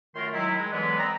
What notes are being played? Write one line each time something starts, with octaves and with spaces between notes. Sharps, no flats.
F#2 D#3 A3 F4 A#4 C6
D#3 F#3 G#3 D#4 E4
G#3
D3 E3 F#3 G#3 B3
C4 A#5